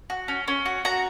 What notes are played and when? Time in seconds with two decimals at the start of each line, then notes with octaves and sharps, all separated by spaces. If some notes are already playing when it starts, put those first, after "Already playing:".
0.10 F#4
0.28 C#4
0.48 C#4
0.66 F#4
0.85 F#4 A#5